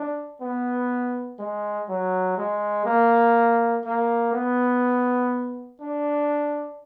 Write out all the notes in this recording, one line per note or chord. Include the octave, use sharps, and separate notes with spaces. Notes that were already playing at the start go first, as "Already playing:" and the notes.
Already playing: D4
B3
G#3
F#3
G#3
A#3
A#3
B3
D4